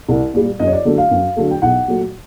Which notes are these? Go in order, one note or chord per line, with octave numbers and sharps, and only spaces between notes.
C2
A#2 G3
F#2 D#5
C#5
D5
D3 F#3 A3
F5
F#2
D3 F#3 A3
G5
B1 F#5
A#2 F#3 A3